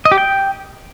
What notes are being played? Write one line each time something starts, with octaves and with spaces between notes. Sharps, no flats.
D#5
G4
G5